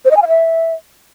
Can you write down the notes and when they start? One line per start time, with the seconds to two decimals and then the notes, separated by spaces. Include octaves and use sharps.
0.05 C5
0.11 D#5
0.16 G#5
0.22 F5
0.28 E5